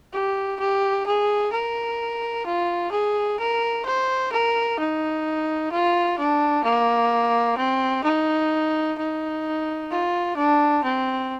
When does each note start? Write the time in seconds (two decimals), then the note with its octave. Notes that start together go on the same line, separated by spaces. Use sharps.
0.13 G4
0.60 G4
1.06 G#4
1.52 A#4
2.46 F4
2.92 G#4
3.40 A#4
3.85 C5
4.32 A#4
4.79 D#4
5.72 F4
6.18 D4
6.64 A#3
7.57 C4
8.04 D#4
8.98 D#4
9.91 F4
10.36 D4
10.83 C4